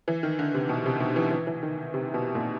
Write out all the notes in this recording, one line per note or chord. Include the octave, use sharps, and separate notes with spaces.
E3
D#3
D3
C3
B2
C3
B2
E3
E3
E3
D#3
C3
B2
A#2